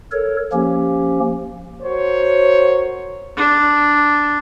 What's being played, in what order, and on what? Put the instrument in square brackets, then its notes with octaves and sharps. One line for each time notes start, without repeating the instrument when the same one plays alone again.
[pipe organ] A4 A#4 C#5
F3 A#3 C#4 G4
[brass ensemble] F#4 A#4 C5 C#5
[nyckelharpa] D4